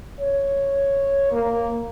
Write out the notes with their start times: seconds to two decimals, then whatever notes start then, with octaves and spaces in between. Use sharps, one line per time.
0.20 C#5
1.32 A#3